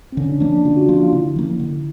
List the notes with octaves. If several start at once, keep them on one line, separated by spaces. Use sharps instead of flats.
C4
D3 C#4
D4
F3 A#3 C#4 D4
D4
D3 F4
F#4
F3 A#3 C#4 F4
F4
D3 E4
F3 A#3 C#4
D3